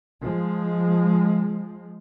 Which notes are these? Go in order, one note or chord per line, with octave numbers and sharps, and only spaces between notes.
F3 G#3